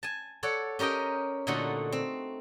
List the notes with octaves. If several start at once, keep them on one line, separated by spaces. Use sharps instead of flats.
G#5 A5
A4 C#5 D5 F#5
C#4 G4 A#4 D#5 G5
A#2 D3 A3 D#4 F#4
C4